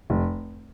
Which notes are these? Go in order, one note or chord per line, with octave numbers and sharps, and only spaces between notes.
F1